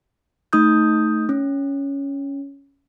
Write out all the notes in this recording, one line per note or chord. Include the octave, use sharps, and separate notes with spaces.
A3 D#4 D#6 G6
C#4